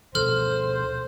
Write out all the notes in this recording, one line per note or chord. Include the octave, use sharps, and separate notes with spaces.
B2 F3 A4 C5 F6